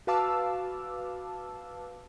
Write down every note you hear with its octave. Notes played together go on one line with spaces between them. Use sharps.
F#4 B4 F5 A5 D6 E6